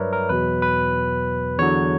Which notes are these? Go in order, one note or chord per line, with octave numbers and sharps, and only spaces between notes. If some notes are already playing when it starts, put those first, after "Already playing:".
Already playing: G2 F#3 A#4 B4 C#5 D5 E5
A#4
E2 B2 F#3 B4
B4
E2 D3 F#3 C#5